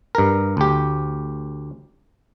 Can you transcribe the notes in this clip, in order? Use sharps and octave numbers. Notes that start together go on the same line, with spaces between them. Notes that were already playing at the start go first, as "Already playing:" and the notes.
G2 A#4
D2 G4